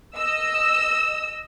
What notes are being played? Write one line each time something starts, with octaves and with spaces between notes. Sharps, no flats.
D#5 E6